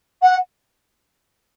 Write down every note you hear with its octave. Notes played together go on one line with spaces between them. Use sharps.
F#5